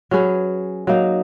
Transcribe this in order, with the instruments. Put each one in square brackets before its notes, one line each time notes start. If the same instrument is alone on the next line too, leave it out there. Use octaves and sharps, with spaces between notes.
[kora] F#3 C#4 G#4 B4
F#3 A#3 D#4